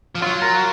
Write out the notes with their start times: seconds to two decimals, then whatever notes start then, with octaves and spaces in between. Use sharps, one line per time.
0.15 F3
0.22 F#3 F4
0.42 A#4